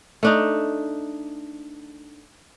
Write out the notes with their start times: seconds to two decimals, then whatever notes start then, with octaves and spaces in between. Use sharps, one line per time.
0.23 A3 D4 D#4